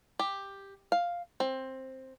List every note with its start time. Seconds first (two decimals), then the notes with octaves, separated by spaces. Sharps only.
0.19 G4
0.92 F5
1.40 C4